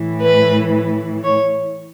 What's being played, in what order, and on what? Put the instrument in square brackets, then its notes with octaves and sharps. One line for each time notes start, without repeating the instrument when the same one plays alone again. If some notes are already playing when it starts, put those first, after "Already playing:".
Already playing: [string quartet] A2 E3
B4
C#5